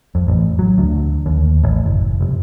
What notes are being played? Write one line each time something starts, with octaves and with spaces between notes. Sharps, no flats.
F2
A1
F#3
D2
D#2
A1
F#1
F1